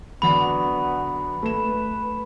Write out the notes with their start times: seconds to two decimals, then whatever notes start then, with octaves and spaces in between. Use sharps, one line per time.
0.22 D3 F#3 B3 D4 B5
1.43 A3 B4 E7